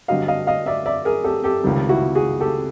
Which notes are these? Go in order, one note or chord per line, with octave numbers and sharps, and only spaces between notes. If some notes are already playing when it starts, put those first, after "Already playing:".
G2 D3 F#3 D#5 F5
D#5 F5
D#5 F5
D5 E5
D5 E5
G#4 A#4
G4 A4
G4 A4
C#2 C3 D#3 G3
E4 F#4
F#4 G#4
G4 A4